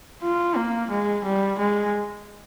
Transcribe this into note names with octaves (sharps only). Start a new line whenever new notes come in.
F4
A#3
G#3
G3
G#3